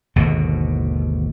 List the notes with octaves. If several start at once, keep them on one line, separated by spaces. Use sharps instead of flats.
G#1 D#2 B2 D3